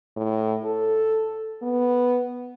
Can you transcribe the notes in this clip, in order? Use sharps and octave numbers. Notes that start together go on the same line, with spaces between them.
A2
A4
B3